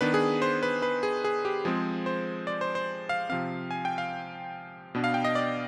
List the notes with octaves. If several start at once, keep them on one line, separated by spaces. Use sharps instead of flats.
D#3 B3 D4 B4
G#4
C5
B4
B4
G#4
G#4
G4
F3 G#3 C4 G#4
C5
D5
C5
C5
F5
C3 F3 C4 F5
G#5
G5
F5
B2 B3 D4
F5
G5
D#5
D5